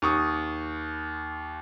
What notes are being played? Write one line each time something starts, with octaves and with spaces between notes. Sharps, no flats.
D#2 C#6 D#6